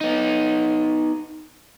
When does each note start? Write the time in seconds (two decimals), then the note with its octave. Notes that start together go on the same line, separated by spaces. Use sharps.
0.01 B3 D#4